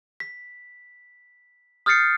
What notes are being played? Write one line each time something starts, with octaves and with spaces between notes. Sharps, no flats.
B6
D#6 F6 G6 A6 C7 C#7